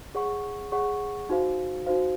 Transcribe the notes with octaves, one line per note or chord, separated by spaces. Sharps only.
G#4 C#5 F#5 C#6
G#4 C#5 F#5 C#6
D#4 F#4 C5 F5
D#4 F#4 C5 F5